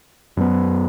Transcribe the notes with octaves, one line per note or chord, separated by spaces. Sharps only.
F#2 F#3 B3